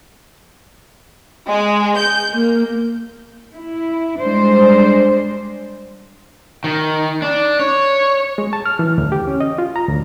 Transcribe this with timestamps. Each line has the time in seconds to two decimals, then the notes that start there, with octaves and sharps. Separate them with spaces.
1.49 G#3
1.98 G6
2.33 A#3
3.53 E4
4.21 G3 G#3 D4 C5
6.64 D#3
7.22 D4
7.60 C#5
8.38 G#3
8.53 A5
8.66 F6
8.79 E3
8.98 D2
9.12 G4
9.27 C#4
9.40 D#5
9.58 F4
9.76 A#5
9.88 D2